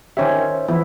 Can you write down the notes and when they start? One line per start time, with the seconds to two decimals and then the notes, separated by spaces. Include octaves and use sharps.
0.17 D#3 C#4 G4 C5 C#5 E5
0.68 E3 F3 B3 E4